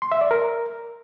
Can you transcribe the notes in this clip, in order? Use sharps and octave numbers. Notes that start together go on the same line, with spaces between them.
C6
E5
D5
A#4